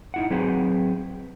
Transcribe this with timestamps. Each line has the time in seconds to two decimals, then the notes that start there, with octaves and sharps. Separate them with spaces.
0.14 D#4 E4 F#5
0.30 F#3 C4 G#4 B4 G5